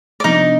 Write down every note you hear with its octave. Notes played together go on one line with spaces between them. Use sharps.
D5
C3 F3 B3 D4 D#4 D#5